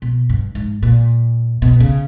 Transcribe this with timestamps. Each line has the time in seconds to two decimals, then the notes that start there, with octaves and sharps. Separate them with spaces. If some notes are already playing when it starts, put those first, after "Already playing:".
0.02 B2
0.29 G2
0.55 G#2
0.82 A#2
1.62 B2
1.80 C#3